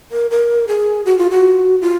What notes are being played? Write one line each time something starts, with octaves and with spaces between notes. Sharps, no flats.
A#4
A#4
G#4
F#4
F4
F#4
F4